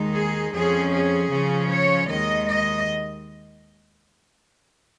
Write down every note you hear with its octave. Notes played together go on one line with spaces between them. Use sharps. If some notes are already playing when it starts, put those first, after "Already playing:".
Already playing: D#2 D#3 G#3 D#4
G#4
F2 F3 C#4 G#4
G#4
C#3 F3 C#4
C#5
D#2 D#3 G#3 D#5
D#5